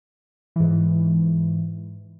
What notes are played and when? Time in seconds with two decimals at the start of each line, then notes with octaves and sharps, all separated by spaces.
0.56 G#2 E3